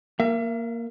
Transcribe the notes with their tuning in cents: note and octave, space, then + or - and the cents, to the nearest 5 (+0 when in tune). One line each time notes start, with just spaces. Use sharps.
A#3 +0 E5 +40